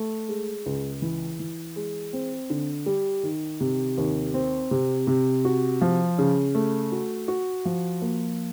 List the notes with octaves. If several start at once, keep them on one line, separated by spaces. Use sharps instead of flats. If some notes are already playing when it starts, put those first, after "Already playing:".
Already playing: A3
G#3
C#2
E3
E3
G#3
C4
D3
G3
D#3
C3
D#2
C4
C3
C3
F#4
F3
C#3
A3
F#4
F#4
F3
A#3